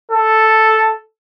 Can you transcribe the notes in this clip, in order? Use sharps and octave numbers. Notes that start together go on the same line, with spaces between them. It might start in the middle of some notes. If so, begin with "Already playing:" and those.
A4